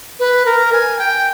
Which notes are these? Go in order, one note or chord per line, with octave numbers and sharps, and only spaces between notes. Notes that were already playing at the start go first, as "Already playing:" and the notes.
B4
A#4
G#5
G5